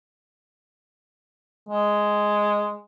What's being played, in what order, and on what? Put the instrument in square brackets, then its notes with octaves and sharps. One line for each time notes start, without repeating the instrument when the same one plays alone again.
[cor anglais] G#3